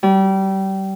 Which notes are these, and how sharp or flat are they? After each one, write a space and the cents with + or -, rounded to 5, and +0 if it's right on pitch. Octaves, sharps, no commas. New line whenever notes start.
G3 -25